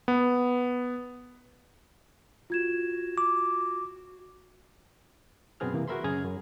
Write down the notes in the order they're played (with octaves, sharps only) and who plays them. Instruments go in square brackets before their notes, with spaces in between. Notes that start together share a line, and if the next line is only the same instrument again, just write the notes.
[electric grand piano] B3
[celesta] F4 G#6 E7 [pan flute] F#4
[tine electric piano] D6
[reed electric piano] F#2 B2 B3 C4 G#4 F6
C3 E3 A#3
F#4 G#4 A#4 E5 B5 C6
F#2 C#3 G#4 A#5 F6 G#6
F#2